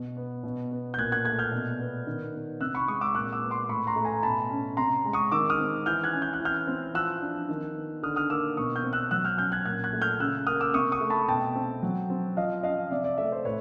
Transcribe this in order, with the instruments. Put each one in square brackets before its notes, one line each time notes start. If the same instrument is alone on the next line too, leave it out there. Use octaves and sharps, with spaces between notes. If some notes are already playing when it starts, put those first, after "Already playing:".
Already playing: [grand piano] B2
B3
B2
B3
G6
A#2 F#6 G#6
F#6 G#6
A3 F#6 G#6
F6 G6
B2
B3
D#3
B3
C3 E6 F#6
B5 C#6
G#3 C#6 D#6
D6 E6
A#2 E6 F#6
D6 E6
B3
C6 D6
A2 B5 C#6
A#5 C6
A3
G#5 A#5
B2 A5 B5
C#4
C3 A#5 C6
G#3
C#6 D#6
D#3 D6 E6
D#6 F6
C4
E3 F6 G6
F#6 G#6
C#4
G6
F#6
E3
F6 G6
C4
F3 E6 F#6
D4
D#3
B3
D3 D#6 F6
D#6 F6
A#3 D6 E6
B2 C#6 D#6
F6 G6
C4
E6 F#6
F#3 E6 F#6
F6 G6
C#4 F6 G6
F#6 G#6
A#2 F#6 G#6
F#6 G#6
A3
F6 G6
C#3 E6 F#6
A#3 D#6 F6
D6 E6
C3 C#6 D#6
C#6 D#6
A3
A5 B5
B2 G5 A5
C4
F#3
C4
F3 D#5 F5
C#4 D#5 F5
C3 D5 E5
D5 E5
A3 D5 E5
C5
A2 B4 C#5